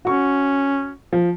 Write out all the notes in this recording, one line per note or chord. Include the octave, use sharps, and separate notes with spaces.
C#4 F#4 C#6
F3